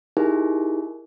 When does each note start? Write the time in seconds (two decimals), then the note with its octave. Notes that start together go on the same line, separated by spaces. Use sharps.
0.17 D#4 E4 G4 G#4 A#4